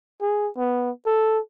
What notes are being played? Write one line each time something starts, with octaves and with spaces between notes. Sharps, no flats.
G#4
B3
A4